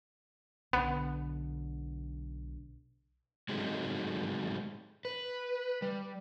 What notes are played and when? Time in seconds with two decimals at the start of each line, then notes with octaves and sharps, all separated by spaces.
0.73 B1 D3 B3
3.49 F#3 G#3 A3 C4 D#4
5.05 B4
5.82 G3